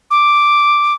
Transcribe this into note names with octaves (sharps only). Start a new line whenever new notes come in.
D6